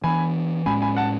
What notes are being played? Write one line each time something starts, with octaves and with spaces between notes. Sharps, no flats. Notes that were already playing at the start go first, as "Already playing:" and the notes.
E3 B3 D4 G#5 B5
A2 G#3 C#4 G#5 B5
G#5 B5
F#5 A5